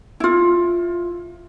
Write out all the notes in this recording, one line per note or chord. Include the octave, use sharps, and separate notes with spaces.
E4 F4